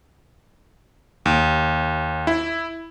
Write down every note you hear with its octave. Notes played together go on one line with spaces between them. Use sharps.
D#2
E4